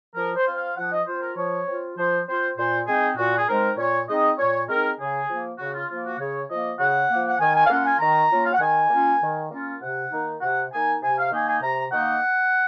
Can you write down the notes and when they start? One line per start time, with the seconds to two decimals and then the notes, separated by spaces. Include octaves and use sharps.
0.15 F3 A#4
0.36 C5
0.46 C4 F4
0.56 F5
0.76 F3 F#5
0.91 D#5
1.06 C4 F4 C5
1.21 A#4
1.36 F3 C#5
1.67 C4 F4
1.97 F3 C5
2.27 C4 F4 C5
2.57 A#2 C5
2.86 G#3 C4 D#4 G#4
3.17 A#2 F#4
3.36 G#4
3.47 G#3 C4 D#4 A#4
3.77 A#2 C#5
4.07 G#3 C4 D#4 D#5
4.38 A#2 C#5
4.68 G#3 C4 D#4 A#4
4.98 C#3 G#4
5.28 F3 A#3
5.58 C#3 F#4
5.73 F4
5.89 F3 A#3 F4
6.04 F#4
6.19 C#3 C#5
6.49 F3 A#3 D#5
6.79 C#3 F#5
7.09 A#3
7.14 F3
7.28 F#5
7.39 D#3 G#5
7.54 G#5
7.65 F5
7.69 A#3 C#4 F4 F#5
7.85 G#5
7.99 D#3 A#5
8.30 A#3 C#4 F4
8.45 F5
8.52 F#5
8.60 D#3 G#5
8.90 A#3 C#4 F4
9.21 D#3
9.51 A#3 C#4 F4
9.81 C3 F#5
10.11 D#3 A#3 D#4
10.41 C3 F#5
10.71 D#3 A#3 D#4 G#5
11.02 C3 G#5
11.17 F5
11.31 D#3 A#3 D#4 G#5
11.46 G#5
11.61 C3 A#5
11.92 D#3 A#3 D#4 F#5